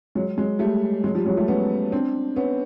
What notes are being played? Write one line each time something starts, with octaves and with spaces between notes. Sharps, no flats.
F#3 G#3
F#3 G#3
G3 A3
F#3 G#3
F3 G3
F#3 G#3
G3 A3
B3 C#4
C4 D4
B3 C#4